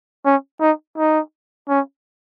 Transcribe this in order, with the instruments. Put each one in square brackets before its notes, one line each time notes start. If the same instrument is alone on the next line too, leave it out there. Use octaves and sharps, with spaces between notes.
[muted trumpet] C#4
D#4
D#4
C#4